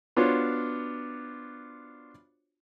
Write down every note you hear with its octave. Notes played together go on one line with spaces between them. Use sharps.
B3 D4 F4 F#4 C5 C#5